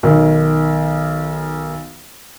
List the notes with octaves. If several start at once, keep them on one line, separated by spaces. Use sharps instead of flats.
B1 D#3